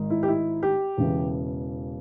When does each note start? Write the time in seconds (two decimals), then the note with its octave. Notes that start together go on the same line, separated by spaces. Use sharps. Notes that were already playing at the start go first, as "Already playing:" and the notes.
Already playing: G#1 G#2 D#3
0.10 E4
0.23 G4
0.28 E4
0.63 G4
0.97 E1 C#3 E3